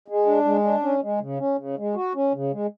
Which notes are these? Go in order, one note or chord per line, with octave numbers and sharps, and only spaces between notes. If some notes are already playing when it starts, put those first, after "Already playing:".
G#3
D4
G#3
D4
C#4
G#3
C#3
C#4
C#3
G#3
F#4
C#4
C#3
G#3